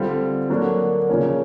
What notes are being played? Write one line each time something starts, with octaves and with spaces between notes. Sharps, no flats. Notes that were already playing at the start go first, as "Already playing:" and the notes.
Already playing: D3 G3 C4 F4
D3 F#3 A#3 D4 F#4
C#3 F3 A#3 C#4